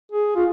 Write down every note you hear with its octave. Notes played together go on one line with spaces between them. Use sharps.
G#4
F4